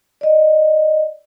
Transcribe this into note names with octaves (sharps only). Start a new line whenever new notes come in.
D5 D#5